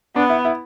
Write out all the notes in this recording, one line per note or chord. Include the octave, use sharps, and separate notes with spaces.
B3 D4
E4
E4